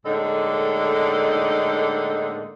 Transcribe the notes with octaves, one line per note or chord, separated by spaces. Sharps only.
A2 D3 G#3 A#3 D#4 A4